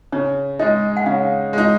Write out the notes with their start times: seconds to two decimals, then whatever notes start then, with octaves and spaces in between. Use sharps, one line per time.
0.12 C#3 C#5
0.59 G#3 D#4 D#5
0.97 F#5
1.06 C#3 F5
1.53 G#3 D#4